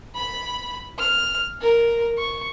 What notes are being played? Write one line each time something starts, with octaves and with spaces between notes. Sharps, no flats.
B5
F6
A#4
C#6